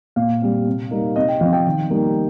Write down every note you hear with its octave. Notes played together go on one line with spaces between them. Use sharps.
A#2 F5
G3 C4
C3
G3 A#3 D#4
C3 D#5
G5
F3 C4 F5
G5
D#3
G3 A#3 D#4